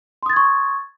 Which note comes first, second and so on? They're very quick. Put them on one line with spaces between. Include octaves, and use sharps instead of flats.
C6 D#6 A6 G#6 C#6